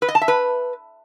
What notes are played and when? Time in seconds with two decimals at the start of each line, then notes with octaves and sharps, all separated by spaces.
0.02 B4
0.09 D#5
0.15 A5
0.21 E5
0.28 B4